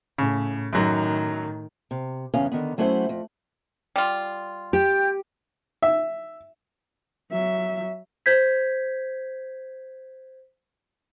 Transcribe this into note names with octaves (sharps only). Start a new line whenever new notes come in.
A2 C#3
F#2 A2 D#3 F#3
C3
E2 G2 C#3 B3 C#4 F5
D3 D#3 B3
F#3 A3 C#4 E4 C5 F#5
F2
G3 F4
G4 G5
E5
F#3 E5
C5 G6 G#6 B6